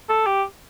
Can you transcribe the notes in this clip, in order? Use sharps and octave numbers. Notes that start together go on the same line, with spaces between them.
A4
G4